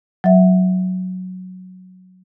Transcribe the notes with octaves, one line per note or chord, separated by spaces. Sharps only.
F#3 E5